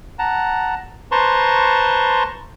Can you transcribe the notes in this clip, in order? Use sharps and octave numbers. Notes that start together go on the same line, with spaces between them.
F#5 A5 A#5
B4 C5 A5 A#5 C6 C#6